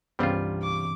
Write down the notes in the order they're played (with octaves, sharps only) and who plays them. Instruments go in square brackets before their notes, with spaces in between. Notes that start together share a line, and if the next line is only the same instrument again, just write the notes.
[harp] C2 G2 E3 [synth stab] C#3 B3 C4 [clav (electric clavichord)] G3 F4
[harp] C#6 [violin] D6